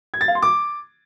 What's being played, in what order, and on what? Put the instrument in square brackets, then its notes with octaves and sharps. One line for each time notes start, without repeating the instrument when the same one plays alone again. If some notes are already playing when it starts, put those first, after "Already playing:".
[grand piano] G#6
A6
F5
C6
D6